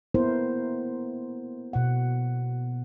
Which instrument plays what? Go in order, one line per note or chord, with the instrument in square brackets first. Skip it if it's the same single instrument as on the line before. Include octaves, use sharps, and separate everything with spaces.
[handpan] A#3 B3 E4 A#4 C5
B2 F#5